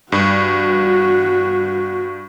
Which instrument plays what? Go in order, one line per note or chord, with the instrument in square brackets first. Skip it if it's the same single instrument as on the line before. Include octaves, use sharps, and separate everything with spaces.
[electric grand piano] G2 [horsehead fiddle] F#4